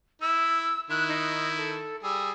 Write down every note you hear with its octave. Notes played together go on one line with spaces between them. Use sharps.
E4 E6
D#3 E4 F#6
D#4
A4
G3 G#4 E6